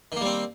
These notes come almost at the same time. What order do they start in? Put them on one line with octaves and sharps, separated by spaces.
D#3 A#3 G3 C4